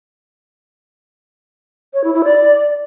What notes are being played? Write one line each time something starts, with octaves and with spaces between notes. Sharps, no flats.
C#5
E4
E4
D5